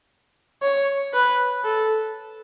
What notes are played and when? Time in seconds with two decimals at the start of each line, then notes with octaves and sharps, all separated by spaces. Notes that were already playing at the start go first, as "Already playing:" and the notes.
0.62 C#5
1.13 B4
1.64 A4